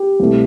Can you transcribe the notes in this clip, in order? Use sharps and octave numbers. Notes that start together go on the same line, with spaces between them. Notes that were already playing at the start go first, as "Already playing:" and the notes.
Already playing: G4
C2 B2 A3